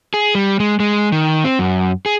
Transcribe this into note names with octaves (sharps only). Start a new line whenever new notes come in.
G#4
G3
G#3
G#3
D#3
C4
F#2
G#4